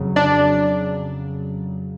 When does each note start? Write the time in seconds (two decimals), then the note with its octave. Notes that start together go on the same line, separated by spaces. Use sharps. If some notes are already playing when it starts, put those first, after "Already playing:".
Already playing: F2 C#3 F#3
0.16 D4 D5